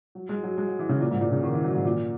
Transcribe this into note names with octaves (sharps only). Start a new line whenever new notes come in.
F#3
G#3
F#3
G#3
F#3
E3
C#3
A#2
G#2
A#2
C#3
D#3
E3
F#3
G#2
A#2